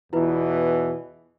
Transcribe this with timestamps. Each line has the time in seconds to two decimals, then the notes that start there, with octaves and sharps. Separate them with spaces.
0.13 E2 B2 E3 E4 F4 B4